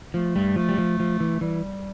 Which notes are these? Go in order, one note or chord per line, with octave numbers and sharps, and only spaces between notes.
F3 A3
G2 G3
F3 A3
G3
F3
F3
E3
E3 G3